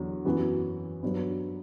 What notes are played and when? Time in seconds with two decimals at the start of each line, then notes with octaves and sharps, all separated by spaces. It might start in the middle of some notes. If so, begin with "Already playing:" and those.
Already playing: E2 D3 F#3
0.25 F#2 E3 B3 F#4
1.03 G2 F#3 B3